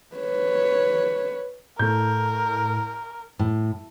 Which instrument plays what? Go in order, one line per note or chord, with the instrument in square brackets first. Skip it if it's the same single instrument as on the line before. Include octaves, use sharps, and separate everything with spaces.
[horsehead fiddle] B4 C#5
[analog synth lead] A2 [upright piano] A3 G6 [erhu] A#4
[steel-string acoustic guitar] A2